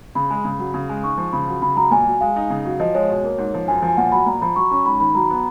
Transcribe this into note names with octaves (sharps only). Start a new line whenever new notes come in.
C#3 B5
G#3
C#3
F#3
C#3
G#3
G#2 C#6
F3
C#3 B5
F#3
C#3 B5
F#3 A#5
A#2 G#5
F#3
G#3 F5
D#4
C#3
F#3
F3 D#5
G#3 C#5
B2
A#3
G#2
F3
F#2 G#5
F3
G#5
A#2 F#5
F#3 B5
A#2 A#5
F3 B5
F#3 C#6
C#4 C#6
G#2 B5
D#3 B5
F#3 A#5
B3